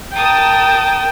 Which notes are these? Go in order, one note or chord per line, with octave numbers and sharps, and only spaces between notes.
A#4 G5 A5 D#6